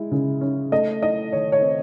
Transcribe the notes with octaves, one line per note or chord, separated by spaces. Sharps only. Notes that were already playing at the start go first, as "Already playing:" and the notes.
Already playing: G#3 E4
C#3
C#4
A3 D#5
E4 D#5
D#3 C#5
C#5
C4